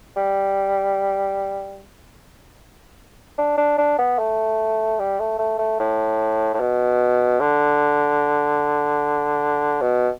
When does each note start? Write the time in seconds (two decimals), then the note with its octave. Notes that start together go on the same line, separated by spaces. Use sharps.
0.16 G3
3.38 D4
3.57 D4
3.78 D4
3.98 B3
4.19 A3
4.99 G3
5.20 A3
5.39 A3
5.59 A3
5.80 A2
6.54 A2
6.60 B2
7.40 D3
9.81 B2